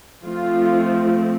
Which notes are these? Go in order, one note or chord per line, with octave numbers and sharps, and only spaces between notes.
F3 A3 C4 F4